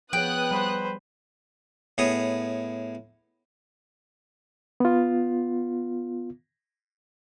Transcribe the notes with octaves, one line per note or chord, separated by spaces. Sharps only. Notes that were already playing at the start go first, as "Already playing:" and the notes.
F3 B3 G#4 C#5 G5 D#6 F#6
G3 B4 C5
A2 B3 G#4 C#5 B5 D#6
B3 F4